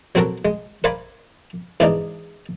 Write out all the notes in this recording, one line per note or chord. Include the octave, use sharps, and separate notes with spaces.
F#3 C4 F#4 A4 A#4
G#3
A#4 C5 D5 F5 G#5 B5
E2 G#2 E3 D4 D#4 D5